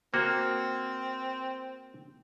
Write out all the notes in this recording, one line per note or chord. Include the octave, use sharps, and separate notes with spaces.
A#3 C4 F#4